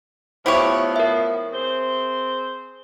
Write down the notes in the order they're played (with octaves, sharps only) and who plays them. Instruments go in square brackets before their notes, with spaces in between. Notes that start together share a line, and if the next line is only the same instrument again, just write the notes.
[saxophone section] A2 F3 B3 [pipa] E4 G4 C#5 [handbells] C5 E5
[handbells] A#4 E5
[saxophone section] C4 G#4 C5